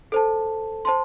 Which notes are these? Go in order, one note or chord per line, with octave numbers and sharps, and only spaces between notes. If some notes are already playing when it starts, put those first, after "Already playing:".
A4 C5 A5
C5 A5 C6